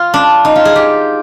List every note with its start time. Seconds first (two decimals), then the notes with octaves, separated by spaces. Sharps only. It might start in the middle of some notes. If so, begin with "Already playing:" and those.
Already playing: F4
0.14 D4
0.45 D#4
0.55 F4
0.65 G#4
0.76 G4